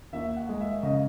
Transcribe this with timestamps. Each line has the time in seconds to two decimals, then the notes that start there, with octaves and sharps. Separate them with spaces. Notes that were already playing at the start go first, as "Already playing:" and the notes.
0.13 D#2 E5
0.36 F#5
0.49 G#3
0.60 E5
0.83 C#3 D#5